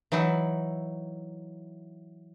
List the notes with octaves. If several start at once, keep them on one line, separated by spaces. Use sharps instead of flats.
E3 F#3 D#4 E4